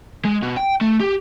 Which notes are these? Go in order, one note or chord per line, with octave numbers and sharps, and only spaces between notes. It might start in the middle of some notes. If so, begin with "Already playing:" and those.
G#3
B2
G5
A3
G4